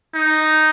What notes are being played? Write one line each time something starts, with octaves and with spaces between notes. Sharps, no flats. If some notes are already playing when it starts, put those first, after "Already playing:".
D#4